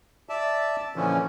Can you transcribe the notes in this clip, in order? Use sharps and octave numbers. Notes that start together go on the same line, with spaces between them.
D5 E5 A5
A#2 D3 E3 F3 C#4